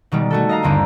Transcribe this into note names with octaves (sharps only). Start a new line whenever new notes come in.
B2 D#3 G3 G#3
A3 F#4 A4
D#5 F5 A#5
G1 D#2 D3 C4 D4